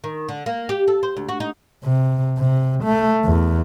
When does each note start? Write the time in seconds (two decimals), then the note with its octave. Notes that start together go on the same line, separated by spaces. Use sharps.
0.04 D#3
0.29 D3
0.46 A#3
0.69 G4
0.88 A4
1.03 C5
1.17 D2
1.28 F#4
1.40 D#4
1.84 C3
2.38 C3
2.84 A3
3.24 E2